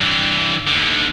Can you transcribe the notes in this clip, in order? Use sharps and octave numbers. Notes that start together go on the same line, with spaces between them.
G2 E3
D#2 D3